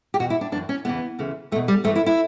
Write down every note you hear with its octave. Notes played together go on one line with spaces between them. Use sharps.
G4
E2 B2 F#4
E4
D4
F#2 E3 D4
C#4
E2 C#3 E3 B3
D2 C#3 E3
E2 B2 A3
G3
G2 E3 A3
E4
E4